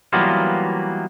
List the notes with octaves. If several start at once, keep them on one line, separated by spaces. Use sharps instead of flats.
E3 F#3 G3 A#3 B3 F4